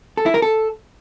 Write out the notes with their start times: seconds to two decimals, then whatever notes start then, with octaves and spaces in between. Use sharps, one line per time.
0.17 A4
0.26 E4
0.34 A#4
0.42 A4